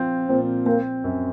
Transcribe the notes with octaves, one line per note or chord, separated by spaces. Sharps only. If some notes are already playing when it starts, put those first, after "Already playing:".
Already playing: F3 C4 F4
A#2 C4
A#3 C4
F#2